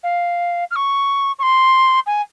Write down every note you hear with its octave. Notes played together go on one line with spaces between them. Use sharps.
F5
F6
C#6
C#6
C6
G#5